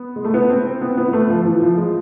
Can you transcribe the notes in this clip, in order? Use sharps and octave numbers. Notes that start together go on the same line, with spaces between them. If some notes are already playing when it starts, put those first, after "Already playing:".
Already playing: B3
G#3
A3
B3
C4
C4
B3
B3
B3
A3
F3
E3
F3
G#3